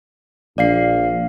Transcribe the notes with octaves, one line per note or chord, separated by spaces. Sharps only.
A#1 D5 F5 C7